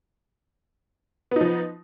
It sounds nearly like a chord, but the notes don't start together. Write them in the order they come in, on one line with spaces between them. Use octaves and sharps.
B3 D#4 F3